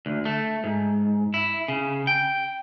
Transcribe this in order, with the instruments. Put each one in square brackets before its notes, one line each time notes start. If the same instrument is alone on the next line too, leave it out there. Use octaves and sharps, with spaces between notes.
[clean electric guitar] D2
A3
G#2
E4
C#3
G5